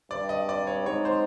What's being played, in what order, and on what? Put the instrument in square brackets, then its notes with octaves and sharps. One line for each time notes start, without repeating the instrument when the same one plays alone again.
[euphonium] G2 [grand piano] D5
[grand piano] D#5
D5
C#5
[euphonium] G#2 [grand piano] C#5
[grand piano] C5